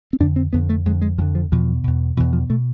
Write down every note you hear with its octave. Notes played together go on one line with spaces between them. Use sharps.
C4
F2 D3 D4
C4
F2 D3 B3
A3
F2 D3 G#3
G#3
F2 D3 F3
F3
E2 B2 F3
E2 B2
E2 B2 E3
F3
B2 A3